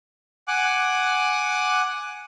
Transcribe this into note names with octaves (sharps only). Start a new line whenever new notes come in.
F#5 G#5 D6 F#6